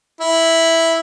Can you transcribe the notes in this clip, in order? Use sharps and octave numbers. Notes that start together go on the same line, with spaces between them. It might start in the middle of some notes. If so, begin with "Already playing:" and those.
E4